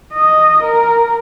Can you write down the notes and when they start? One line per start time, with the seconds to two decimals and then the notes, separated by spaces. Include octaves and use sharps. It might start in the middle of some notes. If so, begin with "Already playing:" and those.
0.13 D#5
0.64 A#4